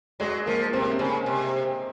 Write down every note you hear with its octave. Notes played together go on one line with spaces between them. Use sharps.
F#3 G#3
F3 A#3
C3 C4
A#3
C4
C#3
C3